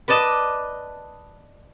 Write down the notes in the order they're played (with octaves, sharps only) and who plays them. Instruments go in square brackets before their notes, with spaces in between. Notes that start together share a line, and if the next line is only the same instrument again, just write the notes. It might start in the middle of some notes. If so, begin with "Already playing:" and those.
[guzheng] B4 D5 D#5 A5